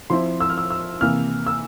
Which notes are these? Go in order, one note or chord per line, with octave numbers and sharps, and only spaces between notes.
F3 C4 E4 C6
E6
F6
E6
E6
C3 E3 A#3 F6
E6